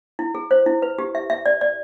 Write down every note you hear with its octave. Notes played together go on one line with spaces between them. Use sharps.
E4
G#4
C5
E4
B4
G4
E5
E5
D5
D5